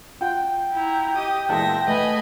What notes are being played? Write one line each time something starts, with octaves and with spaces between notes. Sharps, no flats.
F4 F#5 G5
E4 A#5
G4 D#5 D#6
E2 A#2 G#3 E5 F#5 A5 F#6 A#6
A3 B4 D#5 G#5 B5